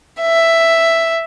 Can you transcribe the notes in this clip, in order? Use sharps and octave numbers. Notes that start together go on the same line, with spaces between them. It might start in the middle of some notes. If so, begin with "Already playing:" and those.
E5